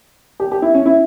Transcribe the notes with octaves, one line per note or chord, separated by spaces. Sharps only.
G4
G4
E4
C#4
E4